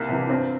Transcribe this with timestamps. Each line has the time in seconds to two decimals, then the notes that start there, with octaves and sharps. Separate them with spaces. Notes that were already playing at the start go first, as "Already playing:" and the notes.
Already playing: C2 A#3
0.09 C3 E3
0.20 D4
0.29 G2 C4